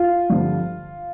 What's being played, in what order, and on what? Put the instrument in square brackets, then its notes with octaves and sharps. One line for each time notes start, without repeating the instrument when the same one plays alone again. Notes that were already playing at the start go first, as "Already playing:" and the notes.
Already playing: [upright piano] F4
G2 D3 F3